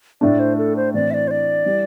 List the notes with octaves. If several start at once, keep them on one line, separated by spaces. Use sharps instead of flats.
A2 A3 D4 D5
C5
A4
C5
A2 E3 C4 D5
E5
D5
C5
D5
G3 E4